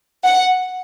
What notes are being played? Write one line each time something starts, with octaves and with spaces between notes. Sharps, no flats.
F#5